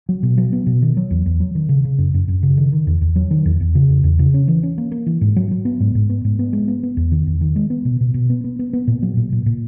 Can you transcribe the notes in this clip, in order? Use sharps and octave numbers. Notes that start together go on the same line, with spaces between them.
F#3
B2
F#3
B3
B2
D#3
F#3
E2
E2
F#3
D#3
C#3
C#3
F#2
F#2
F#2
C#3
D#3
D#3
E2
E2
F#3
D#3
E2
E2
C#3
E2
E2
C#3
C#4
E3
C#4
A#3
A#3
E3
G#2
F#3
F#3
B3
G#2
G#2
B3
G#2
B3
G#3
B3
B3
E2
D#3
E2
D#3
G#3
B3
B2
B2
B2
B3
B3
B3
B3
A#2
F#3
A#2
A#2
A#2